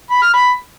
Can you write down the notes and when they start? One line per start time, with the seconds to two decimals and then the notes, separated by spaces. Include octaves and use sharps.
0.11 B5
0.22 F6
0.34 B5